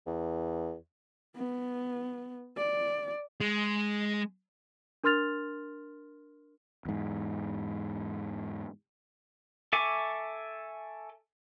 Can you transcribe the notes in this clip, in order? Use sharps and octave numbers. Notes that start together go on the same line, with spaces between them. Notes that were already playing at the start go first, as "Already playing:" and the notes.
E2
B3
D5
G#3
D4 A#4 C6 F6 A6 F7
E2 G#2
A4 E5 G#5 C#6 D6